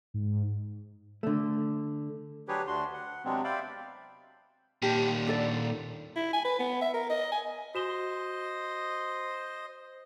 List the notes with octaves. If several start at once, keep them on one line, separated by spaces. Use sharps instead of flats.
G#2
D3 A3
F#3 D4 G4 G#4 B4 C#5
D2 D4 F#4 C6
F#5
C3 F#3 G#3 B3 C4 D4
C5 D5 E5 F5 G5 B5
A#2 D#3 G4 A#4 A5
D4 A4 D5
E4
G#5
B4
B3
E5
A#4
D#5
G#5
F#4 C5 D#5 E7 G7